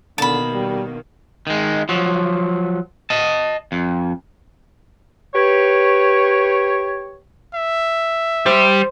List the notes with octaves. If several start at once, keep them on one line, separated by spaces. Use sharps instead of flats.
B2 D3 D#3 A#3 A5 B5
G3
D#3 G#3
F3 F#3
D#5 A5
F2
G4 B4 C#5
E5
G3 C5